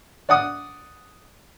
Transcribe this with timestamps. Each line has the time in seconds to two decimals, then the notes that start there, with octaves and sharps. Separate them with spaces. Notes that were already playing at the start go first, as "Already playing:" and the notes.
0.29 D5 F#5 D#6